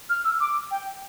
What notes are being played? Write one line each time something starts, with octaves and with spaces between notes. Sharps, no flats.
F6
E6
D6
G5
G5